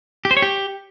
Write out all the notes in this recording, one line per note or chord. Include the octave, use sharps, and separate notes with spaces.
G4
C5
C#5
G4